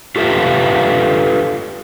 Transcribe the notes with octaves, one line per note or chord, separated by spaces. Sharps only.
F4 G4 A4 B4 E5 F5